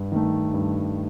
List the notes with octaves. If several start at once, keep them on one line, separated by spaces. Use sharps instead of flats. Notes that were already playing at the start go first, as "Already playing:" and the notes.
Already playing: G2
D#3 A3
G2